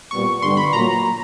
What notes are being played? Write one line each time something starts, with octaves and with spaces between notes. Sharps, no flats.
A#2 G3 B3 C#6
G2 D3 G3 B3 C6
B5
A#2 F#3 A#3 A#5